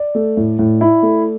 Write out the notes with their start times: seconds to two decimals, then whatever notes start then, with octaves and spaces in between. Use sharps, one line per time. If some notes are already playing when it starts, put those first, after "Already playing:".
Already playing: D5
0.15 A3
0.37 A2
0.59 A2
0.81 E4
1.03 A3